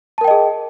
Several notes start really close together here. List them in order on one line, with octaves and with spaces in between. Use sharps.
A5 A#4 G5 D#5 G#4